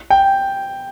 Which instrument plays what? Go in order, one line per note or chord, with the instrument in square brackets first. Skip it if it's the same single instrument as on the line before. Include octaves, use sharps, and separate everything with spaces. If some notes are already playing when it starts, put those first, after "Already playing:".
[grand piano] G5